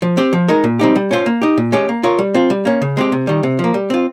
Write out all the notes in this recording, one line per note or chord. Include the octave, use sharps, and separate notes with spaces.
F3
C4 G4 C5
F3
G#3 D#4 A#4
A#2
G3 C4 D#4 G4
G3
C#4 F4 C5
A#3
D#4 G4
A#2
G#3 C#4 G4
A#3
F4 A#4 C#5
G3
C4 F4
G3
A#3 C#4
C#3
G#3 C4 G4
C3
D#3 G3
C3
F3
A#3
G3
C4 F4